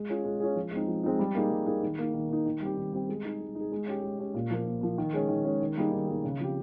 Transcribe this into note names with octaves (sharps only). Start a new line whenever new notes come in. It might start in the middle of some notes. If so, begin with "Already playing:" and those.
Already playing: G#3
C#4 F4 G#4
G#3
C#4 F4 G#4
F3
G#3 C4 D#4
F3
G#3 C4 D#4
G3
A#3 D#4 G#4
G3
A#3 D#4 G#4
D#3
A#3 D#4
D#3
A#3 D#4
D#3
G3 C4 G4
D#3
G3 C4 G4
G#3
D#4 G#4
G#3
D#4
G#4
G#3
C#4 G4
G#3
C#4 G4
A#2
F3 A#3
A#2
F3 A#3
D#3
G#3 C#4 G#4
D#3
G#3 C#4 G#4
D#3
G3 A#3 D#4 G#4
D#3
G3 A#3 D#4 G#4
C#3
F3 C4 G4